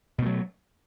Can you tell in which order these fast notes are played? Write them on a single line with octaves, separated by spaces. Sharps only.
B2 A3 F#3